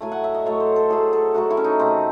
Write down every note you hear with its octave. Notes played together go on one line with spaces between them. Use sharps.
A2 F#3 A3 G#5
F#5
E5
D#5
A2 F#3 A3 C#5
C5
A4
A2 F#3 A3 G#4
A4
A2 F#3 A3 F#4
E4
C#4
D#4
C3 D#3 A3 C4